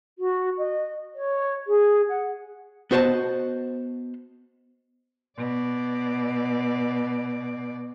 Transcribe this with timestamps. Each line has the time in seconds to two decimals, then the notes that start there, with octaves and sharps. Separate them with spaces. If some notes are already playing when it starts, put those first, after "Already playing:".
0.18 F#4
0.57 D#5
1.15 C#5
1.67 G#4
2.09 F#5
2.91 B3 F#4 C5 D#5 A5
5.38 B2 D5